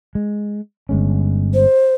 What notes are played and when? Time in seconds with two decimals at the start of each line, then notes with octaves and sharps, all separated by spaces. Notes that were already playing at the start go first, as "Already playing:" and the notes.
0.15 G#3
0.89 G1 G#3 C#4
1.54 C5